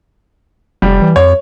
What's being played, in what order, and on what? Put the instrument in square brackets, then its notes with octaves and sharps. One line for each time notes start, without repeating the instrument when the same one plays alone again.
[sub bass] F1 [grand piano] G3
[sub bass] E3
[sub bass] F2 [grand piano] C#5